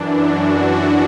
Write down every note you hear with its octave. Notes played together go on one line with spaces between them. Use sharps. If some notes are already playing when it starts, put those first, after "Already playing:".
Already playing: F#2 E3 D4
F#4